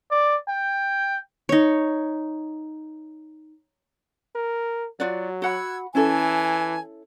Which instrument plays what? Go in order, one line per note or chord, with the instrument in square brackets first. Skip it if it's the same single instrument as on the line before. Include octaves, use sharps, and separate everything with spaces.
[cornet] D5
G5
[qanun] D#4 C#5
[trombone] A#4
[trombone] F#3 [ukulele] F4 F#4 D5
[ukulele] F#4 F#5 B5 [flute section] E6 F#6 G#6
[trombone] E3 [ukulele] C#4 E4 A4 [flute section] G#5 A5 G#6